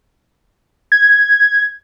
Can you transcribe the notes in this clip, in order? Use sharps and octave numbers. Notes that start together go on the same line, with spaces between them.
G#6